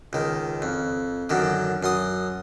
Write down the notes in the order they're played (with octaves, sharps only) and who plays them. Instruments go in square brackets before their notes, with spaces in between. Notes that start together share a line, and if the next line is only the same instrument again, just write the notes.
[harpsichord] C#2 D#3
F2
F#2 D3 D#3
F#2 C6 D#6